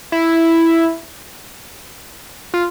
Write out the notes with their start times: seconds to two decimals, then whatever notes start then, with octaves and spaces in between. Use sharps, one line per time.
0.12 E4
2.54 F4